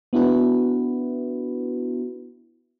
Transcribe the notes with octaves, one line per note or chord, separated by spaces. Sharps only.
B3 D4 E4 F#4 B4